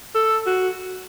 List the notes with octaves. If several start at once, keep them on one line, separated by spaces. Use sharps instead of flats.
A4
F#4